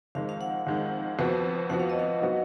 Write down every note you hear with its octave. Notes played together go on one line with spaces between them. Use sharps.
F2 D#3 G#3 F5
F5
F#5
F2 D#3 G#3
F2 F3 B3 F#4
F2 F3 B3 F#4 F#5
F5
D#5
F5
F#3 B3 D#4 F#4